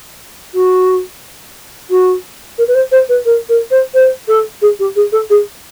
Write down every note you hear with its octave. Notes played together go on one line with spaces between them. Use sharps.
F#4
F#4
A#4
B4
C5
C5
B4
A#4
A#4
C5
C5
A4
G#4
G4
G#4
A4
G#4